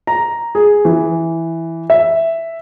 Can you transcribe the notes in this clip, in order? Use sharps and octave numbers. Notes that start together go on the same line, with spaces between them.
A#5
G#4
E3
E5